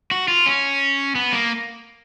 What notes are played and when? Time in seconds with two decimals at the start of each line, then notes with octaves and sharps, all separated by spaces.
0.11 F#4
0.28 F4
0.46 C#4
1.15 B3
1.33 A#3